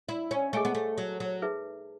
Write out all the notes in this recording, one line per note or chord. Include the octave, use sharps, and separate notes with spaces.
E4
C#4
A3 G#4 D#5 G#5 C#6
B3
A3
F#3
F#3
D#4 G#4 B4 E5